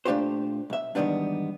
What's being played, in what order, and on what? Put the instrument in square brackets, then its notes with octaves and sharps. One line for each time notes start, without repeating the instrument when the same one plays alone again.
[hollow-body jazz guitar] A#2 A3 D4 F4 G4 C5
B1 E5
E2 G#2 D#3 G3 B3 D4